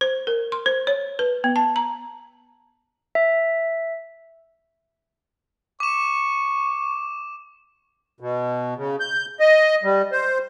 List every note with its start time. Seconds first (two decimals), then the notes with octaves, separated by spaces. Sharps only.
0.01 C5
0.27 A#4
0.52 C6
0.66 C5
0.87 C#5
1.19 B4
1.44 B3
1.56 A5
1.76 A#5
3.15 E5
5.80 C#6 D6 E7
8.20 B2
8.77 C#3
9.00 G6
9.40 D#5
9.83 G3
10.12 C5